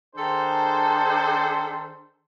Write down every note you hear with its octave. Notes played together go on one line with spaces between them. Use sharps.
D#3 D4 G#4 A4 C5